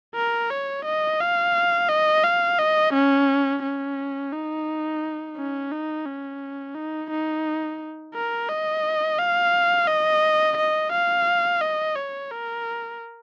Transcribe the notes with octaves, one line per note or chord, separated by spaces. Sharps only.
A#4
C#5
D#5
F5
D#5
F5
D#5
C#4
C#4
D#4
C#4
D#4
C#4
D#4
D#4
A#4
D#5
F5
D#5
D#5
F5
D#5
C#5
A#4